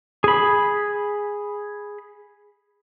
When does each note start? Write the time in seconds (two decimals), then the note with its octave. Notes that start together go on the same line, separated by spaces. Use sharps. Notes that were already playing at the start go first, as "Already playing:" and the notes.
0.24 G#4 B5